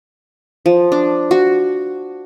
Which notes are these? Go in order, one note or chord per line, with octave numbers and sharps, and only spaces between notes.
F3
D4
F#4